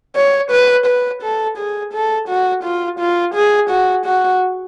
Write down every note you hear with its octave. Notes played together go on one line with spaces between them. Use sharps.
C#5
B4
B4
A4
G#4
A4
F#4
F4
F4
G#4
F#4
F#4